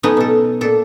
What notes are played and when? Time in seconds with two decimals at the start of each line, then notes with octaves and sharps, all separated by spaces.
0.03 F#3 A3 B3 C#4 D#4
0.17 B2 A4
0.61 A#2 A4